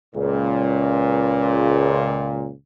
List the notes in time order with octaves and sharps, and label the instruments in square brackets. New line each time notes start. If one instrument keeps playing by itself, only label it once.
[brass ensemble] C#2 A#2